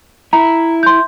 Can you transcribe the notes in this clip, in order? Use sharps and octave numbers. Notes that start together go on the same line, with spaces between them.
E4 A#5
C6 G6